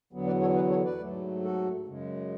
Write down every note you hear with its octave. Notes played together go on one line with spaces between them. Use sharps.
E2 D3 F#3 B3
B4 D5
A4 C#5
G#4 B4
A4 C#5
B4 D5
G#2 F#3 A3
F#4 A4
F#2 C#3 G#3